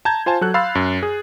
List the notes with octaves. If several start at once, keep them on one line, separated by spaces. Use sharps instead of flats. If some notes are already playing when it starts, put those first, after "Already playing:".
A5 A#5 G6 G#6
F4 C5 G#5 A5
F#3 A4 F#6
F5 B5 C6 E6 A6 C7
F#2
G#4